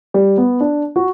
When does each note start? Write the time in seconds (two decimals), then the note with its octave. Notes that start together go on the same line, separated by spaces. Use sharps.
0.14 G3
0.37 B3
0.61 D4
0.96 F#4